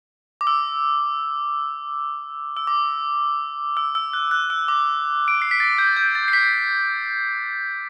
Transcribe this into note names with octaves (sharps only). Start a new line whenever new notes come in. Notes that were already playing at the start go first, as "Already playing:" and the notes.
D6
E6
E6
D6
E6
E6
F#6
F#6
E6
D6
D7
C7
B6
A6
G6
G6
A6
C7
B6